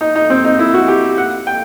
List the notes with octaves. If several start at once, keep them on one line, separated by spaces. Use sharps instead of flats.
D#4
D#4
C4
D#4
E4
F#4
G4
F#5
G5